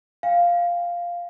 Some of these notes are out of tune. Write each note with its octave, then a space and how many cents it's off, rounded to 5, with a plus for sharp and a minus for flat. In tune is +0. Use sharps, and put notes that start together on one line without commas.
F5 +0 G#5 -45